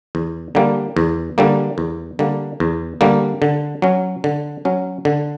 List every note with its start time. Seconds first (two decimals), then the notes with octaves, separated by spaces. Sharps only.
0.15 E2
0.55 D3 G3 A#3
0.97 E2
1.38 D3 G3 A#3
1.78 E2
2.19 D3 G3 A#3
2.60 E2
3.01 D3 G3 A#3
3.42 D3
3.82 F#3 C#4
4.24 D3
4.65 F#3 C#4
5.05 D3